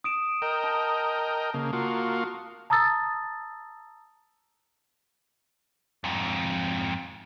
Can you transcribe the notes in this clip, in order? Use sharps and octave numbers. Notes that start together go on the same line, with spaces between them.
D#6 D7 E7
A#4 D#5 G5
A5
C#3 A#3
A#3 F4 F#4
A5 A#5 D#6 E6 A6
F2 G#2